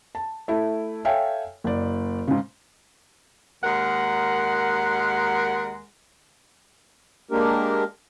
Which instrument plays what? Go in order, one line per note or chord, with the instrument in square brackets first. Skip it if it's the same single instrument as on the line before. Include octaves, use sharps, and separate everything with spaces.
[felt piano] A5
A3 E4
A4 C#5 E5 F5 G5 G#5
F#1 D5
G#2 C#3
[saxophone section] D#2 G#3 A#4 F#5
[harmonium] G#3 A#3 D4 G4 A#4